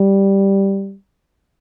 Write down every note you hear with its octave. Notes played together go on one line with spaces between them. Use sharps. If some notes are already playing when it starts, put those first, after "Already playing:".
Already playing: G3